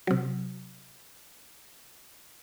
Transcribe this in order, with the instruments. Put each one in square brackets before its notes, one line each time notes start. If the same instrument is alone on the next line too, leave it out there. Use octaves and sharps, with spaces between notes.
[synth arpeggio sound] C3 F#3